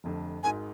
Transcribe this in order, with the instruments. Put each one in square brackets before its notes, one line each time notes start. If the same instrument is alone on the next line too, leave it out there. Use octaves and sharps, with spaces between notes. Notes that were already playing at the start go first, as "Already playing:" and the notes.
[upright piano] F1 F2 D3
[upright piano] G#1 G#2 D#3 [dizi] G#5